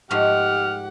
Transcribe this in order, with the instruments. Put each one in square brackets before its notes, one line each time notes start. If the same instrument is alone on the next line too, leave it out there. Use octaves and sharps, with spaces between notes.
[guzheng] G#2 F3 A3 [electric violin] G4 F#5 [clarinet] F6